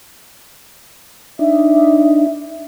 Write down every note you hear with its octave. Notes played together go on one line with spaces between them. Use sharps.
D4 D#4 E5